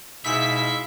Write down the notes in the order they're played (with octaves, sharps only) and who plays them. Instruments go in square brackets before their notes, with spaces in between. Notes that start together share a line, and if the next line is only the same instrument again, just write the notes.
[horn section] G#2 E4 F5 [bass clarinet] B2 [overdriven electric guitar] E5 [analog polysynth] B6